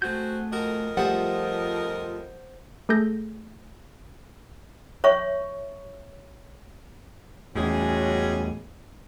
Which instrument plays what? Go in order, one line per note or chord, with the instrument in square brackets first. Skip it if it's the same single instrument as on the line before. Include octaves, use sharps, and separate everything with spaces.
[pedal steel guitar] A3 G#4 G6 [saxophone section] C4 F#4
[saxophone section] F2 A#4 D#5 [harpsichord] F#4
[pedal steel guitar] F3 F4 [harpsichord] G3 A3 G#4 [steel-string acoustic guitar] C5 F#5
[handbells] A3 G#4 A4 G6 A#6
[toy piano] C#5 E5 C#6
[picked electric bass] E2 A2 [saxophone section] G3 G#3 G#4 [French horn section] C#4 F#4